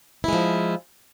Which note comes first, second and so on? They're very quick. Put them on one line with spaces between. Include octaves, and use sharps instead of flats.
E4 G#3 F3